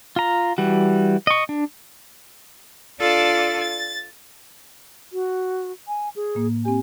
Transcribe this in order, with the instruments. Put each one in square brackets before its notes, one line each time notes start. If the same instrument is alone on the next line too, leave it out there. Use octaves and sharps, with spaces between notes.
[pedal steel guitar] F4 A#5
E3 G3 F#4
D#5 C#6
D4
[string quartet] D4 F4 A4 D5 A6
A6
[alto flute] F#4
G#5
G#4
[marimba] A2 A#3
[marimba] C4 G4 [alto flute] G#5